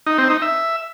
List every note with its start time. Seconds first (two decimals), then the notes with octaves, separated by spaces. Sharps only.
0.07 D#4
0.18 C4
0.30 D#4
0.42 E5